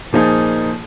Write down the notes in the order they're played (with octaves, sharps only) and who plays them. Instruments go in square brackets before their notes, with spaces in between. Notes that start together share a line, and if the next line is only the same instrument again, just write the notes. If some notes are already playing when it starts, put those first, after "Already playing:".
[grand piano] A#2 F3 A#3 D#4 G#4